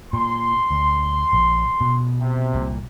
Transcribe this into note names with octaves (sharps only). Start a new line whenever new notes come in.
A#2 C6
D2
A#1
B2
C3
C2 A#2